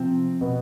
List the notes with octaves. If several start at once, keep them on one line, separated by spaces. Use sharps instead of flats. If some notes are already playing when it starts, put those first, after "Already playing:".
Already playing: C3 F3 C4
B2 B3